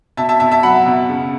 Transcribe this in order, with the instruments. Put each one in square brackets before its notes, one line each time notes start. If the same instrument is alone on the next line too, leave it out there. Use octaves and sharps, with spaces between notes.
[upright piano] B2 E5 A5
E5 A5
B2 E5 A5
E5 A5
F#3 F#5 B5
B2
C#3